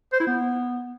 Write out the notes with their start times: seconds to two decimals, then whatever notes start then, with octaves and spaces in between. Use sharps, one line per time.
0.13 C5
0.20 E4
0.27 B3